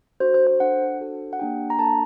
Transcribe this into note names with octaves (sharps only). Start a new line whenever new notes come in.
D4 F#4 A4 C5
C5
C5
D4 A4 F#5
D4 F#4 A4
F#5
A#3 D4 G4 G5
A#5
A#3 D4 A4 A5